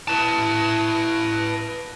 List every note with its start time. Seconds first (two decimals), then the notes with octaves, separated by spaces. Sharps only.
0.08 E4 B4 A5